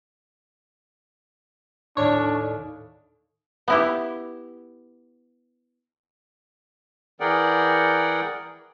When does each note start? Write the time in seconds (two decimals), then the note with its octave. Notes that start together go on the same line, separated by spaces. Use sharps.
1.97 D#2 A2 D4 C#5
3.68 B3 E4 G4
7.20 E3 G#4 A#4 D5 F#5 G5